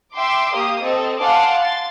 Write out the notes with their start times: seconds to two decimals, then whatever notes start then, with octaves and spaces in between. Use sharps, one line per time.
0.14 E5 G5 C6 D6
0.54 A#3 G4 D#6
0.83 C4 A4 D#5
1.18 F5 F#5 G#5 A5 C6 D6
1.60 C6 A6